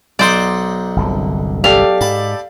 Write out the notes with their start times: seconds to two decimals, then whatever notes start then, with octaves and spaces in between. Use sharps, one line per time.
0.19 B1 D#4 C5 D5 F#5
0.96 G1 C2 D3
1.64 G4 A4 D5 F5
2.01 G#2 A5 B5